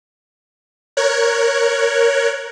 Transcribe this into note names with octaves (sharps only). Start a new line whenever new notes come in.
A#4 C#5 F#6 G#6